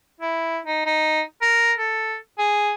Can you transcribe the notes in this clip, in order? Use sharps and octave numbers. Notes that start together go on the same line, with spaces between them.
E4
D#4
D#4
A#4
A4
G#4